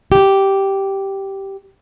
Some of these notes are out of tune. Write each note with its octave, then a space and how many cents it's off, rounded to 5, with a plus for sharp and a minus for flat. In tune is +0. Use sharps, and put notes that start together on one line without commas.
G4 -5